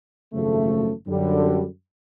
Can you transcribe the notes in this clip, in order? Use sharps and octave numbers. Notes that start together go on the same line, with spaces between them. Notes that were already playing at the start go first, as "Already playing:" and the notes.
G#1 F#2 C#3 F3 A3
F#2 D3 G3